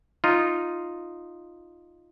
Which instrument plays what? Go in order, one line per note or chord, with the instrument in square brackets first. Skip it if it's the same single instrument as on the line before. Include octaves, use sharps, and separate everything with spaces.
[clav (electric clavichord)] D#4 F4